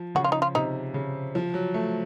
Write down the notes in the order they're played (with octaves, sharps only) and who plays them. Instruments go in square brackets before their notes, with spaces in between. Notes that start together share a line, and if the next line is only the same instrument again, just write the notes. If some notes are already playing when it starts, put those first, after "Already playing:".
Already playing: [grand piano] F3
[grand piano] C#3 [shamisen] F#4
[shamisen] F4
D#4
F4
[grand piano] C3 [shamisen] D#4
[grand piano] C#3
F3
F#3
A3